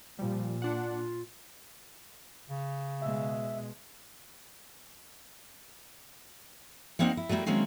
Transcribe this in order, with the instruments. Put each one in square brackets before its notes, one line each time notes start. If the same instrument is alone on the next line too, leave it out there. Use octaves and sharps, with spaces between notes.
[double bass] A#2 [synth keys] F3 G3
[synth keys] D4 F#5 [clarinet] F4
[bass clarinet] C#3
[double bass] B2 G#3 [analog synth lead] E5
[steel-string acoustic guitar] G3 A#3 C4 D#4 C5 F#5
E4
F#3 G3 A3 A#3 E4
D#3 F#3 G#3 A#3 C4 C#4